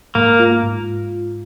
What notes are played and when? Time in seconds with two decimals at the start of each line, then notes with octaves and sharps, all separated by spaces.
0.15 G#2 A#3
0.40 F4
0.63 G#2